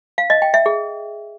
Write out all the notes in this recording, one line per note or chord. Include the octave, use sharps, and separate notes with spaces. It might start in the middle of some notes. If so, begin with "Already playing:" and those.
F5
D#5
G5
E5
G#4